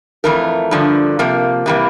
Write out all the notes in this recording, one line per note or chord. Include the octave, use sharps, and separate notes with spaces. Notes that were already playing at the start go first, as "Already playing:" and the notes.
F2 E3 A3 A#4
G2 D3 F3
C3 F3 A#3
C3 E3 G3 A#3